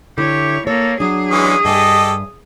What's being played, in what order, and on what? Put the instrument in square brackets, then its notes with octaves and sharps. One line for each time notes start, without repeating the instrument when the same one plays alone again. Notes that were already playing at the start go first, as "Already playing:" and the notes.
[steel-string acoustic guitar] D3 E4 [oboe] G4 [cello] C#5
[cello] A#3 [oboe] A4 [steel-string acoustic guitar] C#5
[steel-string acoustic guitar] F#3 D4 [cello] G#4 [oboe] D#6
[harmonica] E3 G#3 C#4 [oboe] D#6
[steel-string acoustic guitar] G2 E5 G#5 [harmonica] G4 A4 D#5